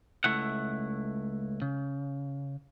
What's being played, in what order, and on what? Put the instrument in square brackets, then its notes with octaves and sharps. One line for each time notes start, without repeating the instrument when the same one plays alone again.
[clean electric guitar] C#2 A3 E4 F#5
C#3